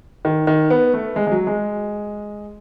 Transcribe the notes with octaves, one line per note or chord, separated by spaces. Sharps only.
D#3
D#3
B3
A3
G#3
G#3
F#3
G#3